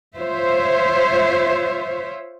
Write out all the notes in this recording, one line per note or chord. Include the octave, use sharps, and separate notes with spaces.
F4 C5 C#5 E5